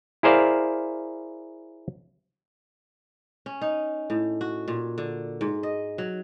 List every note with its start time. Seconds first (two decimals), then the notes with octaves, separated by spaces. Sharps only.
0.23 E4 G#4 A#4 C5 D5 F5
3.46 C#4
3.61 D#4
4.10 A2
4.41 F#4
4.68 A#2
4.98 D3
5.41 G#2
5.63 D#5
5.98 F#3